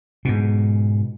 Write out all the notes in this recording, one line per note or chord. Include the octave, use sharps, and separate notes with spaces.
G#2 B2